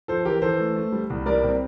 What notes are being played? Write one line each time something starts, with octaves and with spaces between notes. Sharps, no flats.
F3 A4 C5
E3 G4 A#4
E3 A4 C5
A3
A3
G3
C2
G3 A#4 D5
C3